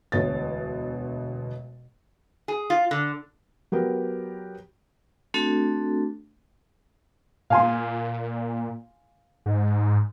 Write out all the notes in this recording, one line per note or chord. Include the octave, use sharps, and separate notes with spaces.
E1 D2 B2 C#5 A6
G#4
F4
D3
F#3 B3 G4 A#4
A3 C4 D4 F#4 A4
A#2 F5 G#5 C6
G#2